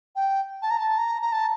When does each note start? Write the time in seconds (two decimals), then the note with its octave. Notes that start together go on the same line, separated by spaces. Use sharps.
0.16 G5
0.62 A5
0.70 A#5
0.78 A5
0.98 A#5
1.22 A#5
1.32 A5